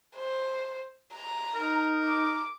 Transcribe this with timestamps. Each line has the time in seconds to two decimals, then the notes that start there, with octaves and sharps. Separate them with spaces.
0.17 C5
1.14 A#5
1.55 D#4 A#4
2.04 D6